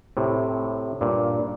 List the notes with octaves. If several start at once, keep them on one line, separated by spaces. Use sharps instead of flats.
A2 C3
G2 A#2